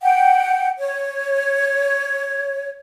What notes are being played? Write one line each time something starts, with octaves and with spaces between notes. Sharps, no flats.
F#5 G5
C#5